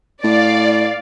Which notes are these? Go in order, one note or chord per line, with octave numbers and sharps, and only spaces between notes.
A2 D5 F5